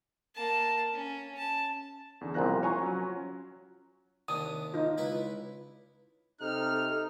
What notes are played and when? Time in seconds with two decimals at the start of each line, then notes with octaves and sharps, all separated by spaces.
0.35 A#3 A5
0.93 C#4
1.38 A5
2.21 E2 D3 C#4
2.34 C2 A#2 F3 F5 F#6 A#6
2.63 C#5 F#5 G#5 A#5 C6 F#6
2.81 F#3 C#4 F4
4.28 D#2 C3 D4 D#6
4.74 D#4 F4
4.98 C#2 E4 B4
6.41 C3 D#4 A4 F6